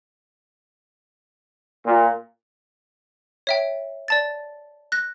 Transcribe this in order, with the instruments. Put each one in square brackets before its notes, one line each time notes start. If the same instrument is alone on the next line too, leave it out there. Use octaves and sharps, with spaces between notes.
[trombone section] A#2
[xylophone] C#5 E5 G5
D5 A5 A6
F#6 A#6